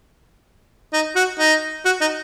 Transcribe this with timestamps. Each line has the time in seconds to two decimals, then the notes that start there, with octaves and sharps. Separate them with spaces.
0.93 D#4
1.16 F#4
1.39 D#4
1.85 F#4
2.01 D#4